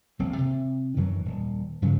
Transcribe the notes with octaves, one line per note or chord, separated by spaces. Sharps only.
D#1 A#1 C4
C3
F#2 D#3 E3 F#3
D#1
G2 C#3 F3 F#3